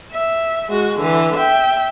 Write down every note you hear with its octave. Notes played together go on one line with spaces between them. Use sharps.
E5
G#3 F#4
D3 E3
E5 G5